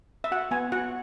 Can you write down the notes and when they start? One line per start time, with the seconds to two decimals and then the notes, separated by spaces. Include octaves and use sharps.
0.24 E5
0.32 F#4 F#5
0.51 B3 G#5
0.72 F#4 F#5